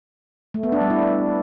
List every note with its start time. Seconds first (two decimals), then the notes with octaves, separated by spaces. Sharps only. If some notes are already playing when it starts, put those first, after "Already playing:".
0.54 A3
0.63 B3
0.72 D4
0.81 G3
0.90 E4